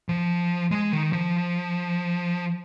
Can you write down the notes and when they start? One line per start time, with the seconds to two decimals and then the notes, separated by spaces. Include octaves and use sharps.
0.09 F3
0.71 G#3
0.92 D#3
1.13 F3